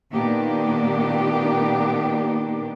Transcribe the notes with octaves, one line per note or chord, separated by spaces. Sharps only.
A#2 D#3 A#3 B3 D4 G4